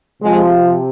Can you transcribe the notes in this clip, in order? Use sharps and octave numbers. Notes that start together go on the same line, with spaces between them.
C3 F3 G#3